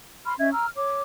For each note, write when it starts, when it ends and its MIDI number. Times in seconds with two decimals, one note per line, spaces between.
0.24 0.33 83
0.24 0.33 84
0.24 0.33 89
0.38 0.50 61
0.38 0.50 75
0.38 0.50 76
0.38 0.50 92
0.51 0.67 82
0.51 0.67 88
0.51 0.67 89
0.76 1.02 73
0.76 1.02 86